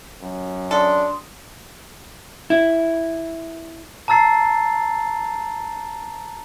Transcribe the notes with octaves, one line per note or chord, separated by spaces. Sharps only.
F#2
D4 A4 C6 D#6
E4
A5 A#5 E6 A6 C7